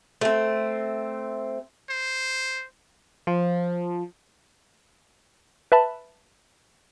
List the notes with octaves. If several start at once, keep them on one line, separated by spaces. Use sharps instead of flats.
A3 C4
C5
F3
B4 E5 A5 B5